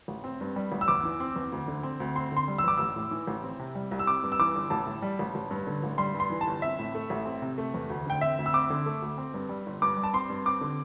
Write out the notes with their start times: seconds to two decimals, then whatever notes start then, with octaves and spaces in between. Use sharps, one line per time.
0.08 A1
0.24 C4
0.41 G2
0.56 G3
0.72 A1
0.81 E6
0.88 E2 D6
1.03 E3
1.20 C4
1.36 E2
1.52 D2
1.68 D3
1.83 C4
2.00 D2
2.16 C4 C6
2.32 D3 C6
2.48 G3
2.58 E6
2.64 E2 D6
2.77 A1 E6
2.96 A2
3.11 E3
3.27 A1
3.43 C4
3.59 C3
3.75 G3
3.91 C2
3.99 E6
4.07 C4 D6
4.23 G2
4.32 E6
4.39 E3 D6
4.55 G1
4.70 A1 A5
4.87 A2
5.02 G3
5.19 A1
5.35 A1
5.51 G2
5.67 D3
5.83 A1
5.98 G3 C6
6.14 G2
6.20 C6
6.30 E3
6.41 A5
6.47 G1
6.62 C4 E5
6.79 A2
6.95 A3
7.10 A1
7.26 C4
7.42 C3
7.58 A3
7.74 E2
7.90 D2
8.07 D3 G5
8.21 C4 E5
8.38 D2
8.46 E6
8.53 C4 D6
8.70 D3
8.86 A3
9.02 D2
9.18 C4
9.34 G2
9.49 G3
9.66 G1
9.82 G2 D6
9.97 G3
10.04 A5
10.13 C4 C6
10.30 G2
10.46 C4 D6
10.61 D3